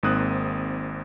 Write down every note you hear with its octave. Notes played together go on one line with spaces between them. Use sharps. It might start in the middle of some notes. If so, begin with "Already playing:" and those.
G#1 G#2 A#3 C4 D#6 F#6